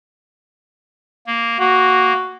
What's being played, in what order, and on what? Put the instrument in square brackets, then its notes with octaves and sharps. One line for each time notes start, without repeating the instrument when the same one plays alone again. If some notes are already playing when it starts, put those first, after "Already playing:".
[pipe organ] A#3
[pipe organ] A#3 [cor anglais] F#4